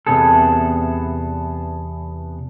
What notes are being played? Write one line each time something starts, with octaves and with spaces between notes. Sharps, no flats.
E2 G#2 C3 B3 G#4 A4